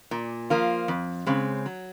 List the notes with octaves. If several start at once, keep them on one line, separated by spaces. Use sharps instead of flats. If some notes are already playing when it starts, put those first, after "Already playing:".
A#2
F3 A#3 F4
F2
C#3 G#3 C4
F#3